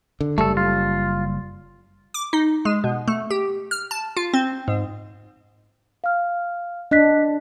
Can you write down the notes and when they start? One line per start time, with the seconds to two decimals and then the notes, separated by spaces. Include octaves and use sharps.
0.21 D3
0.38 F#1 G3 A3 A4
0.57 F4
2.14 D6
2.33 D#4
2.65 G#3
2.84 B2
3.08 A3
3.31 G4
3.71 F6
3.91 A5
4.17 F4
4.34 C4
4.68 G#2
6.04 F5 F6
6.91 D4 D#5 F#6 B6